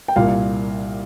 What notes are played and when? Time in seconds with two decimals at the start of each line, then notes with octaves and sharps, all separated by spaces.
0.08 G5
0.16 C2 A#2 A#3 F5